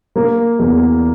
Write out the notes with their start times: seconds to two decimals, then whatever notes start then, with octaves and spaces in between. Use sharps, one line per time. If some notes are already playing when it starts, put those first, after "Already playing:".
0.16 A#3
0.59 E2